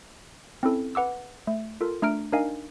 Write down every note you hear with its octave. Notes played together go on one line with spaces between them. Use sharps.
C4 C#4 E4 A4
B4 F#5 D6 E6
A3
F4 A4 A#4
A3 D4 A#5 F6 D7
D4 D#4 A#4 D#5 F5 G#5